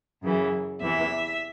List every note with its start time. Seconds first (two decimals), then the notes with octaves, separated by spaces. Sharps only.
0.22 F#2 C#3 E3
0.81 E2 C3 E3 E5